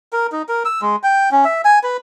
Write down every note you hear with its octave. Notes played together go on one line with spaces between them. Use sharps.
A#4
D#4
A#4
E6
G#3
G5
C#4
E5
G#5
B4